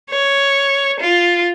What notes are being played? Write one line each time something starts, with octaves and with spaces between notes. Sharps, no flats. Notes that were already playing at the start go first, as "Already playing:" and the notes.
C#5
F4